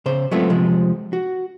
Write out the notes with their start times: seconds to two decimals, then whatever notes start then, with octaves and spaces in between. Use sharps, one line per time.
0.06 C#3 C5
0.31 F#3 G#3 A3 B3 C4 F4
0.50 C3 F3 G#3
1.13 F#4